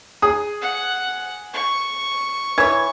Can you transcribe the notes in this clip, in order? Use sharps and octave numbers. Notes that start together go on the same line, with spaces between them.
G#4 D#6
F#5
C#6
E3 C#5 G#6